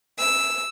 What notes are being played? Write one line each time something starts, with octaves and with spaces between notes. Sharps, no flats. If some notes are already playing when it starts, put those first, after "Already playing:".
E6